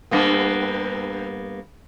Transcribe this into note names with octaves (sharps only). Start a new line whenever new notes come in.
G2 A#3 B3